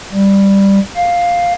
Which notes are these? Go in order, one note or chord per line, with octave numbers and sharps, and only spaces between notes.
G3
F5